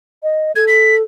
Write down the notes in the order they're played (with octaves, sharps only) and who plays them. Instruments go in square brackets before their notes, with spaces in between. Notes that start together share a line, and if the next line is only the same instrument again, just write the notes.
[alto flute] D#5
[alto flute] A4 [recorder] G#6
[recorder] B6